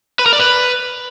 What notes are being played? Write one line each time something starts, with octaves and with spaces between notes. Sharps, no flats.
B4
A#4
D5
B4